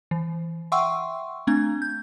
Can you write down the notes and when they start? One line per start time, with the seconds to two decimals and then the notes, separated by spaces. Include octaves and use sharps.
0.11 E3
0.72 E5 F#5 G5 C6 C#6 E6
1.47 A3 C4 D4 G#6
1.82 G6